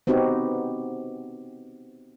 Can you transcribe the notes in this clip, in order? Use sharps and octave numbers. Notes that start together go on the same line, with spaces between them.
B3 C4 D#4 F#4 G4